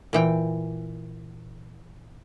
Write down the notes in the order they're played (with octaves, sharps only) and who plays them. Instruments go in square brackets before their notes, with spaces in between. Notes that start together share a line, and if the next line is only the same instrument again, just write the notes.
[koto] A#2 E3 G5